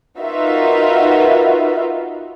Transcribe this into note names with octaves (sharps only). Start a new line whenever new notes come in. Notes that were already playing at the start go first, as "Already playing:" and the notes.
D#4 F4 F#4 A#4 B4 E5